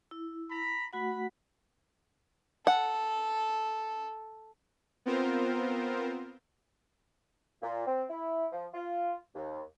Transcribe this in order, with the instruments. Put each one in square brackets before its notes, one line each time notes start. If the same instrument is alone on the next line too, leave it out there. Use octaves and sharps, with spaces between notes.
[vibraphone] E4
[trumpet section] A#5 B5
[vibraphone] A3 F#4 F#5 [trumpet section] B5
[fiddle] A4 [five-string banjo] F#5
[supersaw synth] B3 C4 F4 A#4 C5
[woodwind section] A#2
C4
E4
F3
F4
D#2